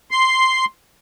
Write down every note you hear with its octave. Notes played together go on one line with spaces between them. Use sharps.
C6